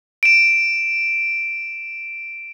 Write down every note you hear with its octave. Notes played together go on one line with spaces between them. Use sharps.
D7 E7